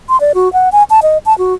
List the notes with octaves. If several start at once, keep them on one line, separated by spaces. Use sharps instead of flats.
C6
D5
F#4
F#5
G#5
A5
D#5
A5
F#4